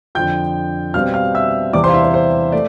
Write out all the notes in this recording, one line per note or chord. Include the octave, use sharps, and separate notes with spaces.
F2 D3 F3 G5 G6
B2 G3 C4 F5 F6
F5 F6
E5 E6
E2 C3 E3 G3 D5 D6
C5 C6
F5
E4 E5
C5
C5
A3 D5